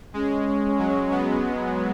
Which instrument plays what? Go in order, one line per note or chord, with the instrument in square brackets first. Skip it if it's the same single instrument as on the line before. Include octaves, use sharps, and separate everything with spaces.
[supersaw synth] G#3 [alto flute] C#4
[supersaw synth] F#3
B3